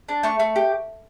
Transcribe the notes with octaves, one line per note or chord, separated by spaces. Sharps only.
D4
A3 C#6
A3
G4